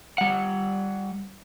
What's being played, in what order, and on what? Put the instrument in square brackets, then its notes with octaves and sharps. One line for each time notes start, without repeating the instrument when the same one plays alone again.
[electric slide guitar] G3 F#5